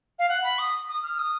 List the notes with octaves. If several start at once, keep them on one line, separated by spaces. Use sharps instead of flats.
F5
F#5
B5
D#6
D#6
F6
D#6